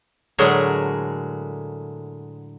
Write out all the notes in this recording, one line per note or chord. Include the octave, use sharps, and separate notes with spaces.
A2 D3 F#3 G#3 G#4 A#4